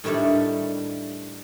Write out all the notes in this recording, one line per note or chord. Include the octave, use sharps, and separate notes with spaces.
A2 D#3 G3 A3 D4